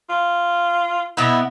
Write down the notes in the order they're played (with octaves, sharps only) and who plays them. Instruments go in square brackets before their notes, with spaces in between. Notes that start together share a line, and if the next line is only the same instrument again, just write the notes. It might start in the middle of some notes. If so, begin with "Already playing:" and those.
[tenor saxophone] F4
[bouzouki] B2 B3 [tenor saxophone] E4